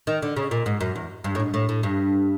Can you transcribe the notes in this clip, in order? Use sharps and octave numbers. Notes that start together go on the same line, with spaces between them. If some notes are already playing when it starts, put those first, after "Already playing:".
D#3
D3
C#3
A#2
G#2
F#2
E2
G2
A2
G#2
A2
A2
G2